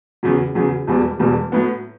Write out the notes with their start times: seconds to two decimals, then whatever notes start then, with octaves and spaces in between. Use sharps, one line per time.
0.23 E2 C#3 F#3
0.55 E2 C#3 F#3
0.87 E1 E2 B2 G3
1.20 E1 E2 B2 G3
1.52 A2 F#3 B3